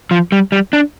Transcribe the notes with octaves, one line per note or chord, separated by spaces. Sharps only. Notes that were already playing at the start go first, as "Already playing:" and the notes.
F3
G3
G3
D4